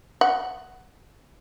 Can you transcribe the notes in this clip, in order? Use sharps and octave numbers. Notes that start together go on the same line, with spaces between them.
F#5